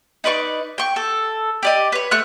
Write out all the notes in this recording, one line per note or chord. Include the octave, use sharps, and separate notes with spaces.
D#4 B4 D5 C#6
G5 C#6
A4
G4 D5 D#5
B4 C#5
A3 C#6 F#6